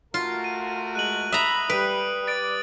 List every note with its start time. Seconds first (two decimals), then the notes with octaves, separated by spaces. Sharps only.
0.14 A3 F4 F#4 A#4
0.44 D#7
0.95 G#3 F#6 D#7 F#7
1.32 E5 A#5 B5 D#6
1.70 G3 B4 D7
2.27 D5 A6 D7